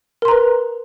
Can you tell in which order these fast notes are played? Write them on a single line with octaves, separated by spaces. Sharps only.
A#4 C6 A#5 B4